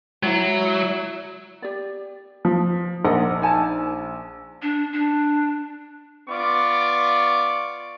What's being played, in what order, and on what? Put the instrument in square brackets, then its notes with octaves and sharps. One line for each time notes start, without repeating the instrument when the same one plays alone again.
[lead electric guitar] F#3 [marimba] G#3 [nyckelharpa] E4
[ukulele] G4 D5
[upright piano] F3
[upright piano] A#1 [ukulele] A#4 D#5 F#5
[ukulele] D#4 G#5 A5
[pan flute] D4
D4
[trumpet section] B3 F4 D5 C#6 D6